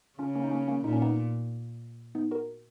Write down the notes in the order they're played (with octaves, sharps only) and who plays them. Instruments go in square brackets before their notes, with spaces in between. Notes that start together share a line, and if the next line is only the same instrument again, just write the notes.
[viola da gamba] C#3 [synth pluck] C#4 F4
[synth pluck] A#3 C#4
D#4
A#3 C#4
A#3 C#4
[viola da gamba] A#2 [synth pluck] D#4
[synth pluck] C#4
B3 D#4
B3 D#4
F#4 A#4